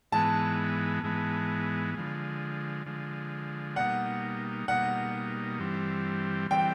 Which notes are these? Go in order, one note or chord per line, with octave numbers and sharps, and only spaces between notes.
G#2 E3 G#3 B3 A5
G#2 E3 G#3 B3
D3 F3 G#3
D3 F3 G#3
B2 G3 A#3 D#4 F#5
B2 G3 A#3 D#4 F#5
G2 E3 G3 C4
E3 G3 C4 G5